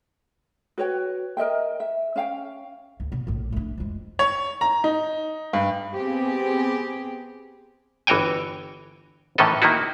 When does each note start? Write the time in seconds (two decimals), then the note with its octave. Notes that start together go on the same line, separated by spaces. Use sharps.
0.78 F#4 B4 C#5 G5
1.37 A#4 D#5 E5 G5
1.80 E5
2.16 C#4 E5 F5 G5
3.00 D2
3.12 B2
3.27 A#1 A2
3.52 A3 D4
3.78 F2 G#3
4.19 C#5
4.61 A#5
4.84 D#4
5.53 G2
5.93 B3 C4 G4 G#4
8.07 G1 E3 F#4 C#5 G5 G#5
9.38 A2 D#3 E3 C#4 A4 D#5
9.62 D#3 A#3 D#4 E4 F#4